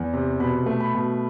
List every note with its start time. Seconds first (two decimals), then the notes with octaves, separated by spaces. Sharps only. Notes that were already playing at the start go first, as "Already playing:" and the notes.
Already playing: E2
0.13 C3
0.40 B2 B5
0.66 A3
0.80 B5
0.94 B2